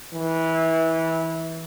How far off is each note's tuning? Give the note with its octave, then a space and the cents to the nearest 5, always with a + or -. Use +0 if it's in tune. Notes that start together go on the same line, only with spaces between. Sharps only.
E3 -20